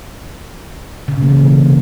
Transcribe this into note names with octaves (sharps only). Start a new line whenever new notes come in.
C#3
B2
A#3
E3
C3